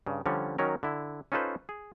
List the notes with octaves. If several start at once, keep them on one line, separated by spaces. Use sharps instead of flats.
G2 C#3
D3 F3 G3 C#4 C#5
D#3 F#3 C#4 A#4
D3 E4
C#4 D#4 F4 A4 B4 C5
G#4